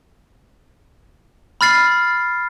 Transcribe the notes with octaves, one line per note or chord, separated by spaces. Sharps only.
B5 F6 A6 C7